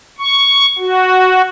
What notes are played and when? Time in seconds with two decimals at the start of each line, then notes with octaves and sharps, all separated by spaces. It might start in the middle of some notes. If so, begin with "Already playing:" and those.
0.19 C#6
0.78 F#4